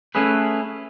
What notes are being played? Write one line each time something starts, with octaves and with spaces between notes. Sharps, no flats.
A3 C#4 E4 G#4 B4